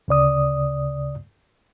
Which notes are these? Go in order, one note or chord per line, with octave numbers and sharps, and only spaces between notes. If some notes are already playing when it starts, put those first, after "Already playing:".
D2 C#3 D5 D#6